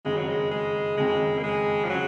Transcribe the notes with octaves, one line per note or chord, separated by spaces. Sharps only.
F#1 F2 D#3 G#3
F#3
G#3
G#3
F#1 F2 D#3 G#3
A#3
G#3
F3
C#3 F#3 G#3 C#4